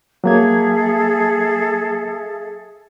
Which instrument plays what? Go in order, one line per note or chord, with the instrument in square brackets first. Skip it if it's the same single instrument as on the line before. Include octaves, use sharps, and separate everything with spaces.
[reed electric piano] F#3 A#3 G#6 [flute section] G#4 A4 E5